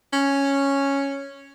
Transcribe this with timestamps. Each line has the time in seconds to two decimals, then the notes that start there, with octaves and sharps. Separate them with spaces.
0.13 C#4